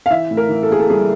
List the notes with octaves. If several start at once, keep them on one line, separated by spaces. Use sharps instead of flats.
F5
E3 E5
A2
A#4
E3
A4
A#3 G#4
A4
G3 G#4